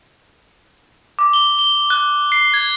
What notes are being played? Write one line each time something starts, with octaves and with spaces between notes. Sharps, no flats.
D6
G7
G7
F#6
C7
G#6